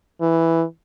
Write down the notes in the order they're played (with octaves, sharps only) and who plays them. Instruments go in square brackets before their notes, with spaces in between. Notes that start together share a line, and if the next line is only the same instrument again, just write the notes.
[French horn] E3